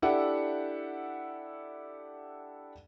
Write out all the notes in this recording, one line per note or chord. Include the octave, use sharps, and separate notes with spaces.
D4 E4 G4 A4 E5 F#5